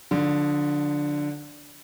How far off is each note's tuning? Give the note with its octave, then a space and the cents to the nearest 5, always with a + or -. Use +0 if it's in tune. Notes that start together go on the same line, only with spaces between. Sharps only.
D3 +0 F3 +35